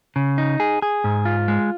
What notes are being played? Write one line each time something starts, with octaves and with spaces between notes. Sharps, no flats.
C#3
D#4
G#4
G#4
G#2
F4
G#3